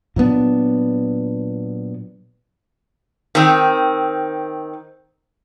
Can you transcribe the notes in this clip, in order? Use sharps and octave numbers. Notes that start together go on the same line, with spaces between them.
A#2 F#3 B3 D4
D#3 C4